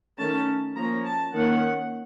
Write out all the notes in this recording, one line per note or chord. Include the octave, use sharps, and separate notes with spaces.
D#3 A3 C#4 A5
F3 A#3 C#4 A#5
A5
D#3 A#3 C#4 F#5